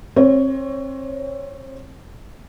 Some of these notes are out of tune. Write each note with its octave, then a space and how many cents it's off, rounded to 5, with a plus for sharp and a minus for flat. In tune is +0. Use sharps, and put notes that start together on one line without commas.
C4 +35 C#5 +15